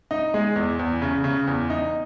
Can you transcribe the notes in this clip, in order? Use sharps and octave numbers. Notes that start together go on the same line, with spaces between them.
D#4
G#3
E2
E2
C#3
C#3
E2
D#4